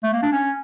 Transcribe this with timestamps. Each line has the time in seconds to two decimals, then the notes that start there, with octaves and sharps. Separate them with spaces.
0.03 A3
0.13 A#3
0.23 D4
0.33 C#4